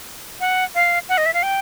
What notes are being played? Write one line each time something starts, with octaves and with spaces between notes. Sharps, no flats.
F#5
F5
F#5
D#5
E5
F5
G5